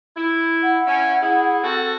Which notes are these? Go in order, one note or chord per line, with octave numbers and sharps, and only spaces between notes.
E4
F#5
C#4 E4
E4 G#4
C4 F#4 A4